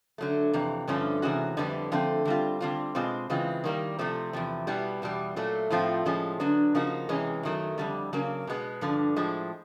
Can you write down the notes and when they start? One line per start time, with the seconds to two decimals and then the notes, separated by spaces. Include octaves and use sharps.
0.18 D3 F#3 A3
0.54 F2 C3 E3
0.88 G2 D3 F3 A3 C#4
1.22 C3 E3 G#3 C#4 F#4
1.57 F2 D3 G3 B3 E4
1.92 D3 F3 A3 C4
2.25 D3 G3 C4 F4
2.61 D3 G3 C4 F4
2.95 B2 G#3 C4 F4
3.30 C#3 E3 G#3 C4 F4
3.64 D#3 G3 A#3
3.99 C3 F3 A3 C4
4.33 E2 C3 F3
4.67 B2 G3 B3 E4
5.02 E2 B2 G3
5.36 A#2 F#3 A3
5.70 A2 F3 A3 C4 F4
6.05 A2 F3 G#3 C#4
6.40 D3 F#3 B3 D4
6.75 C#3 F3 A#3 D#4 F#4
7.09 C3 E3 G#3 C#4
7.43 F#2 D#3 F#3 A3
7.78 F2 D3 G3
8.13 C#3 F#3 A#3
8.47 B2 G#3 B3
8.81 G2 D3 F3
9.16 A2 F3 G#3